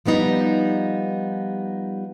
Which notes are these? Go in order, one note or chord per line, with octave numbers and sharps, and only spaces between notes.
F3 G3 B3 D#4